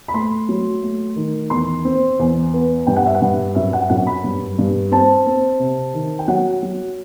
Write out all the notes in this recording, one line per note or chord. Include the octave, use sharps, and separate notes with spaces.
B5
A3 C6
F#3
A3
D#3
E2 C6
C4
E2
B3
G2 G5
F#5
E5
F#5
G2
F#2 E5
F#5
F#2 F#5
B5
G2
G2
C4 A5
C4
C3
D#3
G5
F#3 F#5
F#3